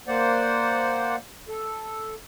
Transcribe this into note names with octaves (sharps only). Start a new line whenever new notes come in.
A#3 C5 D5 F#5
A4